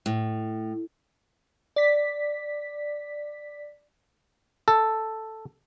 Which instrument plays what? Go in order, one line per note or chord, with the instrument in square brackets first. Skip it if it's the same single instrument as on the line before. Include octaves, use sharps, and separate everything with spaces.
[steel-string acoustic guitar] A2
[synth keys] D5 B6
[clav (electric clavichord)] A4